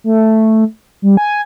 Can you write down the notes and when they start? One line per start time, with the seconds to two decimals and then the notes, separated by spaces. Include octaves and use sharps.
0.04 A3
1.02 G3
1.17 G#5